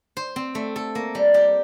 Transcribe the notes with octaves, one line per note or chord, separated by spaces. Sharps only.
C5
C4
A3
A4
A#3
G3
G4